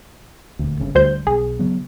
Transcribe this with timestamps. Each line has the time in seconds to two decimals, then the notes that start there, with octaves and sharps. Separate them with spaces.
0.59 D#1 D2
0.80 G1 C#3
0.95 D2 G3 C5 G6
1.27 B1 G#4
1.59 C#3 F#3 B3